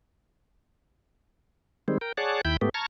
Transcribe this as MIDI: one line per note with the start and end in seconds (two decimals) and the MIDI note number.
1.88 1.98 51
1.88 1.98 55
1.88 1.98 56
1.88 1.98 60
2.01 2.12 70
2.01 2.12 79
2.17 2.41 68
2.17 2.41 73
2.17 2.41 74
2.17 2.41 78
2.17 2.41 81
2.45 2.57 39
2.45 2.57 64
2.45 2.57 79
2.45 2.57 83
2.45 2.57 91
2.61 2.69 44
2.61 2.69 57
2.61 2.69 59
2.61 2.69 67
2.74 2.86 81
2.74 2.86 82
2.74 2.86 85
2.74 2.86 89
2.74 2.86 92